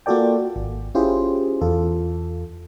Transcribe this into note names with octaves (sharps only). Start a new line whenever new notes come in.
A#3 F4 F#4 A4 D5 G5
G#1
C#4 E4 F4 G4 G#4 C5
E2 F4 A4